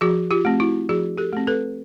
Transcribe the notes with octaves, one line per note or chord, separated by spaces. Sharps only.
F3 F#4 G#4
F4 G4
A3 C4
E4 F#4
F3 F#4 G#4
G4 A4
A3 C4
A4 B4